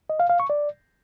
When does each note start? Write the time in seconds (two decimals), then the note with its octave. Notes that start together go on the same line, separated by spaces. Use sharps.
0.10 D#5
0.20 F5
0.30 F5
0.40 C#6
0.50 D5